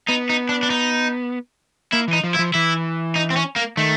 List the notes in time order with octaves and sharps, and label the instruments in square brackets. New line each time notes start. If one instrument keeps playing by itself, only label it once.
[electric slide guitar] B3 [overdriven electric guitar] D#4
[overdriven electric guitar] D#4
D4
D4
D#4
[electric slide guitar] A#3 [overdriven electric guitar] E4
[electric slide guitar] E3
[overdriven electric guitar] D#4
[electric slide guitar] F3
[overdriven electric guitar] E4
[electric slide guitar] F3
[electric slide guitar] E3 [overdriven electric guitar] E4
[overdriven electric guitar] D#4
C4
C#4
A#3
[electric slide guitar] D#3 [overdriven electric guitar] A3